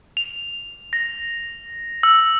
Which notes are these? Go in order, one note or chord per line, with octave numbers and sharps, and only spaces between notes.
F7
A#6
E6